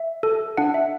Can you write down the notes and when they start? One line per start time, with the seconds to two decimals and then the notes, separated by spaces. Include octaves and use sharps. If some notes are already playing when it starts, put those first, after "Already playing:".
Already playing: E5
0.23 A4
0.57 D4 F#5
0.74 E5